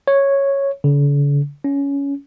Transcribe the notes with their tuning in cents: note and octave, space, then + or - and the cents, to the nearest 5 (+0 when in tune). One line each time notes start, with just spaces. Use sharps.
C#5 -5
D3 -45
C#4 +15